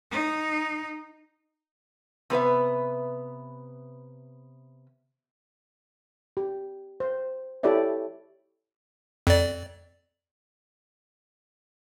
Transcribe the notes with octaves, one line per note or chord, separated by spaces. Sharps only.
D#4
C3 B3 B4 E5
G4
C5
E4 G4 A4 C#5 D5 E5
F2 D5